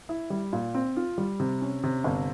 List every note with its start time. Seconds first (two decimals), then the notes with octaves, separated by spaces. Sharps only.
0.09 E4
0.30 G3
0.53 A#2
0.75 C4
0.97 F4
1.18 G3
1.40 C3
1.62 C#4
1.83 C3
2.04 G1